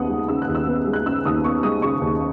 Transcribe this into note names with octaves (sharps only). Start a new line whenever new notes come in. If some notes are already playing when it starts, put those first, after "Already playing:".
Already playing: D#2 C#3 B3 F#5 D#6
G#3
C#3 E6
F#6
D#2
E6
B3
G#3
F#6
C#3 E6
D#2 D#6
B3 C#6
G#3 D#6
C#3 C#6
D#2